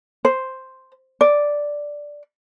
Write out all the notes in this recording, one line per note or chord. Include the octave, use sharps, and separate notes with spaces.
C5
D5